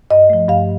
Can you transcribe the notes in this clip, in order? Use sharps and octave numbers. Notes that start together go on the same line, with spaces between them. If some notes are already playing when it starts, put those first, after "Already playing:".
G2 D#5
F3 A3
G2 F5